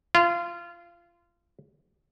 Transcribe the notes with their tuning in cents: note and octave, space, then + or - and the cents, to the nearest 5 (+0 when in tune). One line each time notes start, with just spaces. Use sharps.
F4 -20